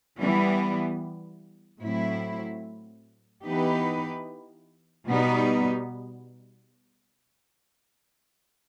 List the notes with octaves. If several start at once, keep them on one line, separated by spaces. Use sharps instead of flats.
E3 G3 B3
A2 F#3 C4 E4
E3 B3 D#4 G4 B4
B2 G3 B3 D#4